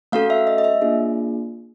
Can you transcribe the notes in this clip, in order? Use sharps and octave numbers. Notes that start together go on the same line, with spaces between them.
A3 C#4 F#4 A4 F5
E5
D#5
D#5
E5
A#3 D4 F4 G#4